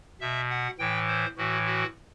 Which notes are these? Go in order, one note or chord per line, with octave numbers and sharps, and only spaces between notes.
B2 E5
F#5
A2 E3 G5
C5
A2 E3 F#4
F#4